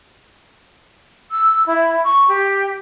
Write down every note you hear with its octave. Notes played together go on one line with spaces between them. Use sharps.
E6
E4
C#6
G4